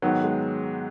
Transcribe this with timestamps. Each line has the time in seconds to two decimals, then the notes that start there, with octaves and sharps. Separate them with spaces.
0.02 G#2 D#3 F#3 B3
0.24 G#3